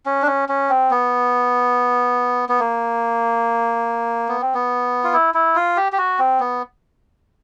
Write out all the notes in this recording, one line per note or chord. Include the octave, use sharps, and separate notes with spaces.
C#4
D4
C#4
C#4
C4
B3
B3
A#3
B3
C4
B3
F4
E4
E4
F4
G4
G4
F#4
C4
B3